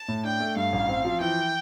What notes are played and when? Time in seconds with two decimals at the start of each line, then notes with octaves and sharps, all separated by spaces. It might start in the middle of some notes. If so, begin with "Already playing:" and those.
Already playing: A5
0.08 A2
0.24 D4 G5
0.40 A3
0.56 G2 F5
0.72 A1
0.89 C4
1.05 F3
1.20 E3 G5